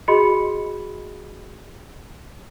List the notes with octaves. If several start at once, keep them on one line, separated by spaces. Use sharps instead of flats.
F#4 G#4 D#5 B5 C6 C#7